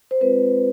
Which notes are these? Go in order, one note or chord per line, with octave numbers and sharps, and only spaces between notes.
C5
G#3 C4 F4 B4